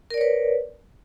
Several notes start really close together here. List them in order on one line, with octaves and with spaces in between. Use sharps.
A#4 D5 C#5 B4